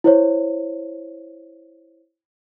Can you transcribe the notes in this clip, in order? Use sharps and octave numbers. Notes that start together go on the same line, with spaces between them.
E4 C5 C#5